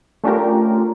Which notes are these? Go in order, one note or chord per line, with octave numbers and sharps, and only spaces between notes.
A3 C#4 D4 F4 G4 A#4